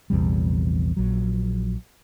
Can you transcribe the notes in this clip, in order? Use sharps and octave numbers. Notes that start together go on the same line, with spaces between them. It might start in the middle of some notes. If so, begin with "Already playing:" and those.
A#1 E2 C3 G3
A#1 F#3